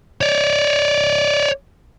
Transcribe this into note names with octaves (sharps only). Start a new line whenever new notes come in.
C#5 D5